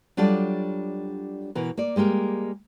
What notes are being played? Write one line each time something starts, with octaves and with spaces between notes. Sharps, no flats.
F#3 G3 D4 F4 A4 D5
B2 E3 A#4
A#3 D5
G3 G#3 A#3 G4 A#4